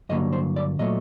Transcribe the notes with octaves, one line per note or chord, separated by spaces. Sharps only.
G2 D3 F#3 A#3 D#5
C5
D5
A#2 F#3 A3 D#5